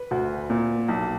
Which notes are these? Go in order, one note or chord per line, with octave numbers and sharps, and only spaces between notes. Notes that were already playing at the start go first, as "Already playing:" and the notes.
Already playing: B4
D2
A#2
B1